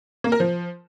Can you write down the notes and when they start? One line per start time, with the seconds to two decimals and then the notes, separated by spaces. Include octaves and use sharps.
0.24 A#3
0.32 A#4
0.40 F3